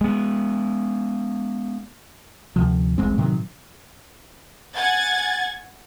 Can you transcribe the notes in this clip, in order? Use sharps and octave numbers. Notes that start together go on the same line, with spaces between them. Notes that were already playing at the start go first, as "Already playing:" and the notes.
G#3 B3
D2 C3 F3
D#1 A1 G#3 C4
A2 C3 D#3 F#3
F#5 G#5 G#6 A6